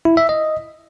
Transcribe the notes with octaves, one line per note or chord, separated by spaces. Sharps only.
E4
E5
D#5